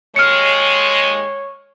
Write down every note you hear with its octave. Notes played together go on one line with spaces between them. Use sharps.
D#2 D#3 G#3 C#5 F6 C#7